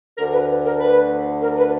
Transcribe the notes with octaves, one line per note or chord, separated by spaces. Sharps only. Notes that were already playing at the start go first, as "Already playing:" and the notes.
D2 D3 A#4
B4
B4
A#4
B4
A#4
B4